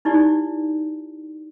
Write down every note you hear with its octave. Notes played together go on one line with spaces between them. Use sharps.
D#4 E4 G4 D5